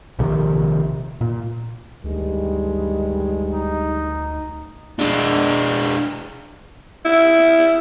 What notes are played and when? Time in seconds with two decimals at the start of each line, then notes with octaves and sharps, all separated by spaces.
0.19 A#1 C3 D#3
1.21 A#2
2.04 D2 G2 D#3 G#3
3.53 D#4
4.99 G#3 D4
7.05 E4